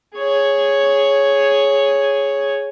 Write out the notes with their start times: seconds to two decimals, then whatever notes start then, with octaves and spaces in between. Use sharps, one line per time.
0.16 G#4 C#5